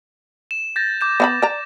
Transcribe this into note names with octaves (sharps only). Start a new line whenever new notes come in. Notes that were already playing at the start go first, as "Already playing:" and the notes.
E7
G6 A6 A#6
D6 G6 E7
B3 F5 B5
D5 A#5